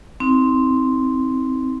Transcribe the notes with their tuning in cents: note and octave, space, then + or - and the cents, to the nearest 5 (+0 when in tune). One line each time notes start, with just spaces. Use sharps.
C4 +0 D#4 +30